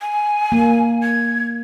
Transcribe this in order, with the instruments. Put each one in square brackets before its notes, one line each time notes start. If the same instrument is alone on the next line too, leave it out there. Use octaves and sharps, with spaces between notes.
[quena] G#5
[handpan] A#3
[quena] G#6